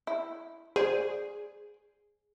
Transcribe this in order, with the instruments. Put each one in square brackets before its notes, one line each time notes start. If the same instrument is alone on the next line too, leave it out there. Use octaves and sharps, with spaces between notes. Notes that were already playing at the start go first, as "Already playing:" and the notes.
[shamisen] E4
[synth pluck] G#4 [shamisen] C5 D5